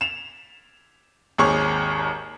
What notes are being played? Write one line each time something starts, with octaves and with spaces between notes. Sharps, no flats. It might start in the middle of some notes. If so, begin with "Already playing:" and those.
E7 F7
G#1 D#2 G#4 C#5 C#6